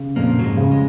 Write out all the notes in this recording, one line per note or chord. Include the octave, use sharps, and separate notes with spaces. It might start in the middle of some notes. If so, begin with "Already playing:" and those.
Already playing: C#3
F2 A#2 A#3
F#3
G#2 G#3
C#3
G#3